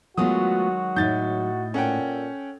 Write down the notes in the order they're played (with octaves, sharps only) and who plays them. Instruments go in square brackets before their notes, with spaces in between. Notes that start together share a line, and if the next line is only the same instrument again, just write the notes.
[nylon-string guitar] D#3 F#3 G#3 [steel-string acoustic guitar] A3 B3 F4 [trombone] F#4 [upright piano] D#6
[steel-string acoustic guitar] A2 D#4 [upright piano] G6 A6
[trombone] A#2 [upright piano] C#4 F#5 G5 [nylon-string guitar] A4